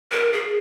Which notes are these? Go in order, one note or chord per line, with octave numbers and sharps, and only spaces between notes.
A#4
G#4